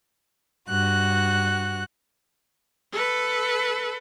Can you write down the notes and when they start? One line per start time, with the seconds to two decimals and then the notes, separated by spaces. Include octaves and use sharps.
0.68 G2 F#4 F#6
2.93 A4 B4